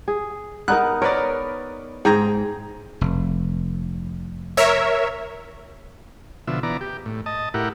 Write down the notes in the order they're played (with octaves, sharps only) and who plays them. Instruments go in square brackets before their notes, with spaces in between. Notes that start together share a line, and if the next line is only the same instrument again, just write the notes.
[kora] G#4
[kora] B3 D#4 A#4 [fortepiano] F#6
[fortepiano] A#4 B4 D5 [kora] C#5
[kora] G#2 [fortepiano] G#4 G5 A#5
[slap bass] F1
[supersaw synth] A#4 C#5 E5
[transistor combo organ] B2 D3 F3 E5
E3 B3 D5 A#5
G4
A2
D#5 A5
A2 E4 G4 A#4 F#5